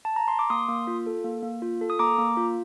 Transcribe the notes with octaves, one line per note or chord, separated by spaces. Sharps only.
A5
A#5
C6
D6
A#3 C6 D#6
A#3
F4
A4
A#3
A#3
F4
A4
D#6
A#3 A#5 D6
A#3
F4